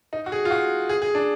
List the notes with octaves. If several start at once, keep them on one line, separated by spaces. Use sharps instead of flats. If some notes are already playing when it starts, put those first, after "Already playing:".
D#4
F#4
G#4
F4
F#4
G#4
G#4
D4